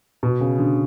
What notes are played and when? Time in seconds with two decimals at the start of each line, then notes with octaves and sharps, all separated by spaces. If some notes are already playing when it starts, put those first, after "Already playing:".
0.23 B2
0.41 C#3
0.58 D3